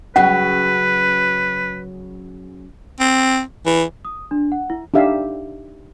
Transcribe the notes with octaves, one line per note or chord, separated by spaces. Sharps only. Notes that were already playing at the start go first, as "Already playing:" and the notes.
C#3 F#3 C#4 B4 F#5
C4
E3
D#6
D4
F#5
E4
D4 D#4 G4 E5 F5